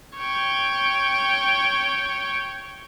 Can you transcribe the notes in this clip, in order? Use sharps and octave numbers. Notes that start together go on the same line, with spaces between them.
C#5 G5